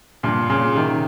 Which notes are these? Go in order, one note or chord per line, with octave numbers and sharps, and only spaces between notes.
G2 A#2
A#2 C#3
C3 D#3